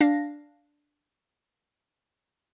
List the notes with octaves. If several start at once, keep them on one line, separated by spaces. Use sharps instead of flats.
D4 F5 A#6